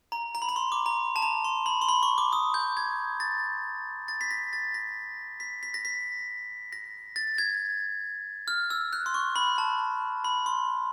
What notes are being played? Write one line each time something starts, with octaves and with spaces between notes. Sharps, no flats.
A#5
A#5
B5
A#5
C6
D6
A#5
A5
A#5
C6
B5
C6
B5
C#6
D6
D#6
G6
G#6
A6
A6
B6
A#6
A6
A#6
B6
B6
A#6
B6
A#6
A6
G#6
F6
E6
F#6
C6
C#6
B5
A5
B5
C6